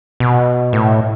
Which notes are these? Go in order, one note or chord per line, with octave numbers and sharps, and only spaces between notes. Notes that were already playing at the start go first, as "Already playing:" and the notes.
B2
A2